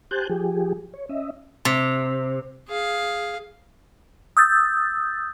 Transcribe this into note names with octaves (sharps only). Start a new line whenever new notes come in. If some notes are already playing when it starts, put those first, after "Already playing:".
G4 C5 G#5 A5 F#6 G6
F3 G4 G#4
C#5
C#4 D#5 E5
C3
G#4 F5
D#6 E6 G6 A6